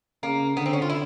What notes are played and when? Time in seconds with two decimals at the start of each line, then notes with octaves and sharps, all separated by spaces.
0.23 C#3 A#3
0.57 D3 B3
0.66 C4
0.73 C#4
0.82 F4
0.89 E4